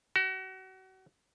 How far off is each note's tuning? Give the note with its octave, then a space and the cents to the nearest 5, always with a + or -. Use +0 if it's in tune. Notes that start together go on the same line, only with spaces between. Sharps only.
F#4 +35